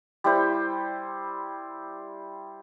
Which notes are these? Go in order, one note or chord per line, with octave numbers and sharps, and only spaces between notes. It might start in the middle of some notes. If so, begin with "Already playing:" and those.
G3 E4 C5